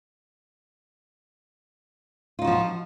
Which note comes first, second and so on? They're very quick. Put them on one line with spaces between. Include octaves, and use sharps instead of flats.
F4 D#4 F#4 F3